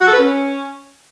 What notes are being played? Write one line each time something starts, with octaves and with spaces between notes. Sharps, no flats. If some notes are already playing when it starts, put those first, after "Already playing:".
F#4
A4
B4
C#4